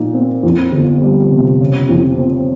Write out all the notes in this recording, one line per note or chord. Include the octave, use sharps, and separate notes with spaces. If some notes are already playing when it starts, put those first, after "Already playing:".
Already playing: A#2 F3 D#4
C4
F2
G1
G3
C3
C#3
F2
C4